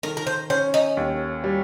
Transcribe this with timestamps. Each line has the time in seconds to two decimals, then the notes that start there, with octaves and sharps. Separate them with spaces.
0.03 D#3 A#4
0.17 A#4
0.27 C5
0.50 C#4 C5
0.74 D#4
0.97 D#2
1.44 G3